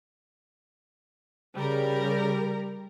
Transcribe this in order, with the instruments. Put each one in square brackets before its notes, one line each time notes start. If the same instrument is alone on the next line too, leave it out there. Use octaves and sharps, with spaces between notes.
[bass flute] C#3 [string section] G3 A#4